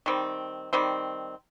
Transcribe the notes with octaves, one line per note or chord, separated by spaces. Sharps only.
D#3 G3 C4
D#3 G3 C4